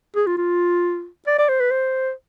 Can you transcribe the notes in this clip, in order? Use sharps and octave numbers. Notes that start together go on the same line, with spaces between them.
G#4
F4
F4
D5
D5
C5
B4
C5